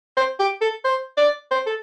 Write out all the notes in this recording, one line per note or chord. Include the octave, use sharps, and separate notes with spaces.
C5
G4
A4
C5
D5
C5
A4